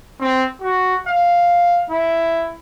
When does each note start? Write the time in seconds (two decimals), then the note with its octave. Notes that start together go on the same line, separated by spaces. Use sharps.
0.21 C4
0.62 F#4
1.07 F5
1.90 E4